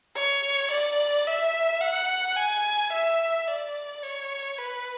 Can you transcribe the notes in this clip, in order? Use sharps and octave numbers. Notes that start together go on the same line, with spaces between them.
C#5
D5
E5
F#5
G#5
E5
D5
C#5
B4